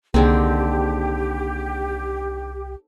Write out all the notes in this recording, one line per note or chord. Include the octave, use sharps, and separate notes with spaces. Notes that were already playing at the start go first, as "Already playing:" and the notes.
C2 D3 D#3 A#3 C4 G4 G#4